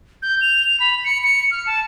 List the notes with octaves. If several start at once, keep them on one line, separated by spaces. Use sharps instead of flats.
G6
F7
B5
C#7
C#7
F6
A5